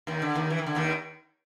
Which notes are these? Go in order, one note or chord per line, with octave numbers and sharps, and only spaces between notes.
D#2 D#3
D3
D#2 D#3
E3
D#3
D3
D#2 D#3